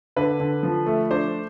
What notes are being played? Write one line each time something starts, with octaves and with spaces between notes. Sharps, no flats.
D3 B4
D3
F3
A3
D4 C5